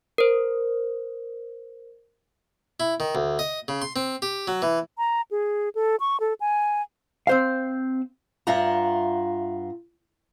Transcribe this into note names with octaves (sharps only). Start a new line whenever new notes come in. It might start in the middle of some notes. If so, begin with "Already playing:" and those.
A#4 C5
E4
D#3
D2
D#5
C#3
C6
C4
G4
F#3
E3
A#5
G#4
A4
C#6
A4
G#5
C4 C5 F5
G2 F4 E5 F#5 A#5